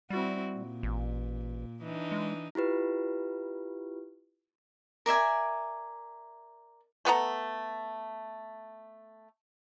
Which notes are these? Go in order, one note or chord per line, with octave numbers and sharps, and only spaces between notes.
G3 C4 E4 F#4
A#2
A1
E3 D4 D#4
G#3
E4 F4 G4 B4
A#4 D5 E5 G#5
A3 B3 A4 A#5